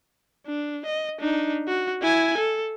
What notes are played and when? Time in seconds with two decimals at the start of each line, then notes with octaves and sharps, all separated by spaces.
0.46 D4
0.86 D#5
1.20 D4 D#4
1.68 F#4
2.02 E4 G#5
2.38 A4